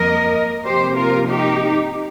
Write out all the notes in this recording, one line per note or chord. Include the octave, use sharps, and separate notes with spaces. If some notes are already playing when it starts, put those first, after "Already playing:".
Already playing: F2 F3 A#3 A#4 D#5
C3 F3 A#3 G4 C5
F4 A#4
D#4 G4